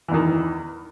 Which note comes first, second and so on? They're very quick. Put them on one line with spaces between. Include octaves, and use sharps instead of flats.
E3 E2 D#3